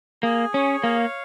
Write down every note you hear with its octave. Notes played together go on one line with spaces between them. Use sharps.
A#3 G#4
C#4 C#5
A#3 F5